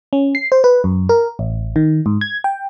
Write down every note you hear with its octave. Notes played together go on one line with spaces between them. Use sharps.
C#4
C7
C5
B4
F#2
A#4
A1
D#3
G#2
G#6
G5